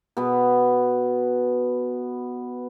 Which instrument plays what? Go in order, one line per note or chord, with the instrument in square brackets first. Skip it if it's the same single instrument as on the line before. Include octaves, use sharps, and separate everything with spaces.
[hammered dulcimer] B2 B3